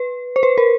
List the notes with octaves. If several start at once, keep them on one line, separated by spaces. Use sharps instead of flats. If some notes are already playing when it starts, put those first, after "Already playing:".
Already playing: B4
C5
B4
A#4